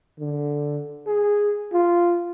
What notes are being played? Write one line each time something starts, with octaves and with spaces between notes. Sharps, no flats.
D3
G#4
F4